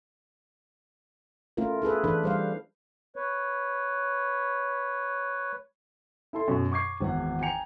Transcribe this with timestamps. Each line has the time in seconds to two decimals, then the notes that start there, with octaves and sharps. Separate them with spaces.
1.57 A3 C#4 E4 F4 A#4
1.82 E4 G#4 A4 B4
2.04 E3 D4 A4 B4
2.23 G3 C5 F5
3.16 B4 C#5
6.33 E4 A4 C6
6.48 F#2 B2
6.72 C#6 D6 G#6 C7
7.01 G#1 E2 F#5
7.41 G5 G#5 A#5 C#7 F7